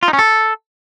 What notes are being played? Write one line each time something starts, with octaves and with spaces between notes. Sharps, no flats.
F4
D#4
C#4
A4